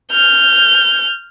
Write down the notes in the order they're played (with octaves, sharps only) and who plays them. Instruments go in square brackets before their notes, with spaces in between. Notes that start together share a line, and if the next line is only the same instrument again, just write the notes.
[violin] F6 G6